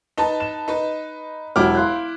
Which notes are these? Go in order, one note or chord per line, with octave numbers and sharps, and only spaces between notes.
D#4 B4 A5
E7
D#4 B4
E1 F#3 E4 G4 F#5 D6 F6
F5 C6 F#6